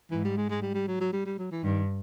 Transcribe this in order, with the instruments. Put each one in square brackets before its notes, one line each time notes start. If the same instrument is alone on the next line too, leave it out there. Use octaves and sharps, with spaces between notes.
[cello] G#2 [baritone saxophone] E3
[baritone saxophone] G3
G#3
G#3
G3
G3
F#3
F#3
G3
G3
F#3
E3
[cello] G2 [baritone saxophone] D#3